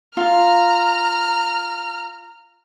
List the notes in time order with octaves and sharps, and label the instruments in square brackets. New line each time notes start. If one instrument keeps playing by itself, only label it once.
[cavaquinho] F4 F5 [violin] A#5 F6